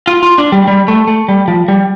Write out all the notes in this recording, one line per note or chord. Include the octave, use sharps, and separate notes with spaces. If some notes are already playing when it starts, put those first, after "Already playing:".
F4
F4
D4
G3
G3
A3
A3
G3
F3
G3